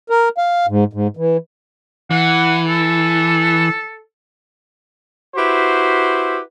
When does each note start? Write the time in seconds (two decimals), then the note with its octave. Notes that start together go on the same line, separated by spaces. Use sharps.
0.10 A#4
0.38 F5
0.68 G#2
0.93 G#2
1.17 E3
2.11 E3 F#5
2.68 A4
5.36 E4 F#4 G4 B4 C5